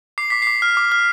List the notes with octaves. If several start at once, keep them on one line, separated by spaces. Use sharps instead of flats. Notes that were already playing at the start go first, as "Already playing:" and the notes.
D6 C7
D6 B6
D6 C7
F6
D6
F6